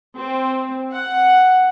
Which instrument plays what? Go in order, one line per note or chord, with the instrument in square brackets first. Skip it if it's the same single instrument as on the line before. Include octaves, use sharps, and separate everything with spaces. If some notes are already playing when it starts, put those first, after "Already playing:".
[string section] C4
F#5